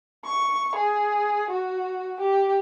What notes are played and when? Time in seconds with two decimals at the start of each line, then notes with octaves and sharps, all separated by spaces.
0.24 C#6
0.75 G#4
1.50 F#4
2.20 G4